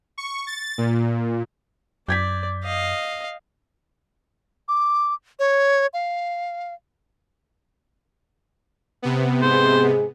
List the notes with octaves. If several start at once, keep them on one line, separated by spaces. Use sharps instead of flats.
C#6
A6
A#2
F#2 D5 G6 G#6 B6
D#5 F5
D6
C#5
F5
C3 B3
G#2 G#4 C5